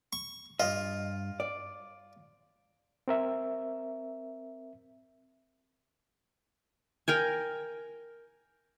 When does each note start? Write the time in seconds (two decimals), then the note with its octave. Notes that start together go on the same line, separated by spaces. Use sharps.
0.13 C#6
0.60 G2 F4 D#5
1.40 D5
3.08 C4 A#4 E5
7.08 A#4 G5 G#5